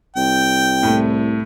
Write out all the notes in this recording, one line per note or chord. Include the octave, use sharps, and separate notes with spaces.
C2 G5
A2 A3